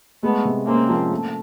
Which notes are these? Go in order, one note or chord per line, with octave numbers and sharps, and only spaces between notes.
G#3 A3 B3
C3
A#3 C4 C#4
F3
A3